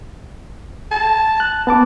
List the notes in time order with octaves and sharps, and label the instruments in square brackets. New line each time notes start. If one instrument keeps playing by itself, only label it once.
[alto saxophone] A5
[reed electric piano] F#6
B3 A5 D6